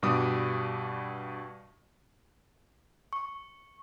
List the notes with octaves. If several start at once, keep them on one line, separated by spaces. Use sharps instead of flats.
G2 B2 G3 D6 D#6
C#6